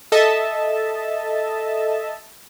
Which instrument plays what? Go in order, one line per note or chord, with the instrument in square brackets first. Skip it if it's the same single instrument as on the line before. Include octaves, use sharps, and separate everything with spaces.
[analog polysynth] A4 D#5 E5 A5